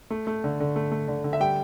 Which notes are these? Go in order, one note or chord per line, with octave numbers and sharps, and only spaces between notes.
A3
A3
D3
D3
A3
A3
D3
D3
E5
G3 G5